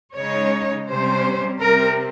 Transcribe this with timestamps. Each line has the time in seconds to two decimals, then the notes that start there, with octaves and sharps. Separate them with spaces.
0.17 C#3 G#3 D#4 C#5
0.89 C3 G3 C#4 C5
1.60 C3 G3 C4 A#4